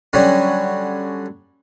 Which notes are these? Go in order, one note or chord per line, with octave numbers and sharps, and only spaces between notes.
D3 F#3 G3 C#4